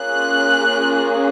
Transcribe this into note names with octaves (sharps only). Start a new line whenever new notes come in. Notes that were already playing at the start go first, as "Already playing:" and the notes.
Already playing: A#3 C#4 F4 G#4 F#6